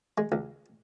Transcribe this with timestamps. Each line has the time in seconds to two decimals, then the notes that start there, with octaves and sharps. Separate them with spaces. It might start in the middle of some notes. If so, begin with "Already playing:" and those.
0.18 G#3
0.32 C#2